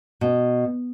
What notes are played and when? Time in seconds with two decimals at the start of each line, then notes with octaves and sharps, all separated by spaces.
0.21 B2